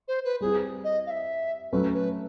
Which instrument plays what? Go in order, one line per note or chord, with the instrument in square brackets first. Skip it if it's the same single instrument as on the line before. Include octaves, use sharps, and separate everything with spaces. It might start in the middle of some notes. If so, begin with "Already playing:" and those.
[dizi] C5
B4
[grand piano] G3 C4 E4 [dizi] G#4
[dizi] D#5
F5
E5
[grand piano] F#3 A3 C#4 [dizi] B4
[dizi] B4